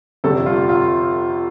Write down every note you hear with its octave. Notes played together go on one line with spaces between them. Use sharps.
G1 F2 C3 G3 A4
F4
F4